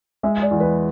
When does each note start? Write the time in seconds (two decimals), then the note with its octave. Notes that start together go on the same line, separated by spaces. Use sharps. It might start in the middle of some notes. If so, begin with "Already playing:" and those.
0.23 G#3 E5
0.42 D5
0.51 E2
0.60 B4